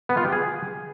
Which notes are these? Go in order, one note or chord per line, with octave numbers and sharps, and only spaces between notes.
B3
F4
G4
G#4